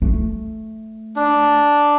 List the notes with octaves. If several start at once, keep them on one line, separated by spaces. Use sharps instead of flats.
A3
D4